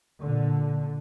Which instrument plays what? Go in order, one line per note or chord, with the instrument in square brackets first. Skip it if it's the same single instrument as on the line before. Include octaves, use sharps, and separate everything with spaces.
[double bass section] A#2 D3